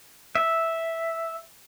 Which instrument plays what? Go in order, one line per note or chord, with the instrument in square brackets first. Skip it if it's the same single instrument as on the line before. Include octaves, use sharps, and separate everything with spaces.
[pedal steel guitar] E5